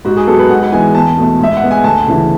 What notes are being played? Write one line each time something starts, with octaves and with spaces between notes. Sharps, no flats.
G#2 F#4
G#4
F#3 B3 A4
B4
G#2 F#5
F#5
E3 G#3 B3 G#5
E2 A5
B2 A3
G#2 E5
F#5
G#3 B3
G#5
D2 A5
C#3 E3